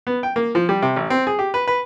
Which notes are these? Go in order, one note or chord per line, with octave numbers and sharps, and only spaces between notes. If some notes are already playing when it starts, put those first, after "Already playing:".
B3
G5
A#3
F3
G3
C3
A1
C4
G#4
G4
B4
B4